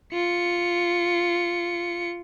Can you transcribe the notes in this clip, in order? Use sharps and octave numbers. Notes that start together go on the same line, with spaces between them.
F4 C#7